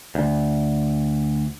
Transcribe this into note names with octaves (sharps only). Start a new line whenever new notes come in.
D2